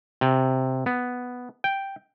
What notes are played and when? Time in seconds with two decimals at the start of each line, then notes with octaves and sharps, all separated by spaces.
0.21 C3
0.86 B3
1.64 G5